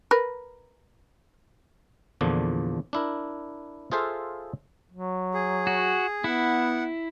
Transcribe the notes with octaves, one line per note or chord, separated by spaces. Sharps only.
A#4 B4
E2 A#2 D3 F3 D4
D4 E4 A#4
F4 G#4 A4 C5 E5 F5
F#3
G#4
F#4
B3 E4 F#5